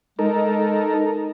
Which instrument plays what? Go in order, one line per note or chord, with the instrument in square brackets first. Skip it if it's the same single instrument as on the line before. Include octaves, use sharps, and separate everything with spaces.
[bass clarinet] G#3 [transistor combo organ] D#4 A4 A#4